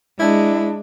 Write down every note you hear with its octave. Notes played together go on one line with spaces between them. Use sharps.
G#3 D4 E4